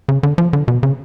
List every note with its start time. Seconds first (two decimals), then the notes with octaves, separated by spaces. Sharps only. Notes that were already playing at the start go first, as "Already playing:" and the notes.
0.09 C#3
0.23 D3
0.38 F3
0.53 D3
0.68 B2
0.83 C#3